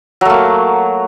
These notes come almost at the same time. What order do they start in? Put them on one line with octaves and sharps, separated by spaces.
F#3 A3 A#3